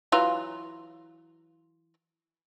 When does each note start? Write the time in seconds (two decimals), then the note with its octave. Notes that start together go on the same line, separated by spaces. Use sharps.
0.12 E3 F#3 F4